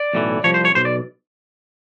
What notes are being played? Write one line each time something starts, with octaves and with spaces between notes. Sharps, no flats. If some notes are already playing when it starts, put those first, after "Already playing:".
Already playing: D5
B1 A2 E3
C2 A#2 F3 C#5
C5
C#5
B1 B2 C5
D5